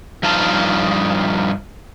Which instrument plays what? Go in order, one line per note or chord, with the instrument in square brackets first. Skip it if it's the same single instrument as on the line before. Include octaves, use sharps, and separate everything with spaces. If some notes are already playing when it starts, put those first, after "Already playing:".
[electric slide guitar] G2 F3 D#4 F5 A5